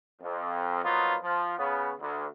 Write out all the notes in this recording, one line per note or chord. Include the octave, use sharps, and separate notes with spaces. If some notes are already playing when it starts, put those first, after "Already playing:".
F2
F3 F#3 A#3 B3 D#4 F4
F3
C#3 B3
D2